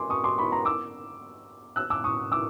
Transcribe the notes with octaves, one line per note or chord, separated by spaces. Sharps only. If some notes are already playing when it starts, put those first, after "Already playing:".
Already playing: G#5 C6 D6
C#6 D#6
C6 D6
B5 C#6
A#5 C6
D6 E6
E6 F#6
D6 E6
C#6 D#6
D6 E6